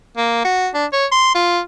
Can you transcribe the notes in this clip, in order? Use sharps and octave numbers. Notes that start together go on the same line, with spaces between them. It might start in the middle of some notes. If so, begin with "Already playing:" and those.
A#3
F#4
D4
C#5
C6
F4